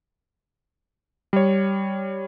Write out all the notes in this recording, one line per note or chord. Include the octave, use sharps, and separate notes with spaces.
G3 C#5